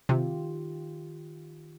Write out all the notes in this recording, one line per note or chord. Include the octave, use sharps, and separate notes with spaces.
C3 D#3 F4 G4